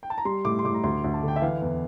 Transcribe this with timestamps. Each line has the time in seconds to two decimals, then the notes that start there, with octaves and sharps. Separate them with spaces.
0.03 G5
0.10 A5
0.18 A#5
0.25 G3 C6
0.45 A2 D6
0.59 C6
0.64 A2 D6
0.74 A#5
0.84 D2 C6
1.04 D2
1.14 A5
1.23 D3
1.28 G5
1.36 E5
1.42 E3 F5
1.62 E2